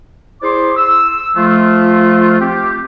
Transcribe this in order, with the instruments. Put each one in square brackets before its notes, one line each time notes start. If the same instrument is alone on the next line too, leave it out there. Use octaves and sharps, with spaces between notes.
[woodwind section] E4 G#4 C5 D5 C6 D6
E6
F3 A3 F4
C4 G4